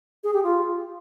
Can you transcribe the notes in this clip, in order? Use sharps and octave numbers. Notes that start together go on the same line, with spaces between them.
G#4
G4
F4